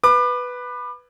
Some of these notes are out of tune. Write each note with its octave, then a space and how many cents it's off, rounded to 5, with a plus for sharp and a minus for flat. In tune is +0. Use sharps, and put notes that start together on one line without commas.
B4 +0 D6 +35